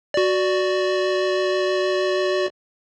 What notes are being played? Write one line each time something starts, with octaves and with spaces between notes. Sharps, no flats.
F#4 D5